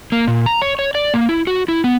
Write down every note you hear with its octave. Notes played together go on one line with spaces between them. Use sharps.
A#3
A#2
A#5
C#5
C#5
D5
A#3
E4
F#4
E4
B3